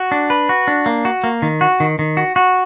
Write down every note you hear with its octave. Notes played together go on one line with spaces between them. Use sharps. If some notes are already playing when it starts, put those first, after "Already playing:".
Already playing: F#4
D4
B4
F#4
D4
A#3
F#4
A#3
D#3
F#4
D#3
D#3
F#4
F#4